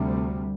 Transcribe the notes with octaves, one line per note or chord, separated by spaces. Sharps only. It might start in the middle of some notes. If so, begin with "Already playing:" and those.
Already playing: D2 C3 G3